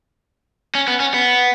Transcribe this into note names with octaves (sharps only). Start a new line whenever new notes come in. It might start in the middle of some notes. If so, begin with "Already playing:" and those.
C#4
B3
C#4
B3